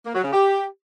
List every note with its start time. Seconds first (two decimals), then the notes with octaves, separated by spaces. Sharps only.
0.06 A#3
0.15 F#3
0.24 C#3
0.33 G4